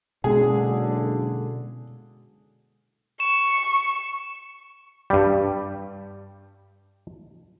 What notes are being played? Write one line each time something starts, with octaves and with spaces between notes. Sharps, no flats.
F#1 B2 D3 G#3 B3 C#4 G#4 A4
C#6 E7
G2 G3